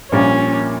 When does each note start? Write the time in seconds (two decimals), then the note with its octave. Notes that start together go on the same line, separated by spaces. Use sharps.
0.12 A#1 A#2 G3 A#3 C#4